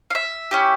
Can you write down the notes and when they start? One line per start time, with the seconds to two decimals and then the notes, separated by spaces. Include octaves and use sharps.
0.10 F5
0.15 E5
0.51 C#4 E4 G4